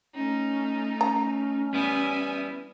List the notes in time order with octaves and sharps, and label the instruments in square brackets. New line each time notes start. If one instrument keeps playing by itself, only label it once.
[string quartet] A3 D#4 [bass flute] C#4
[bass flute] C#4 [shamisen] A#5
[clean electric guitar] G3 B3 E4 [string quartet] E5 G#5